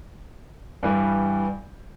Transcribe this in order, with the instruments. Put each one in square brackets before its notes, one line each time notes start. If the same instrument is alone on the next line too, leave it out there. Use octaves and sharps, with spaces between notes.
[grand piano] G2 E3 G3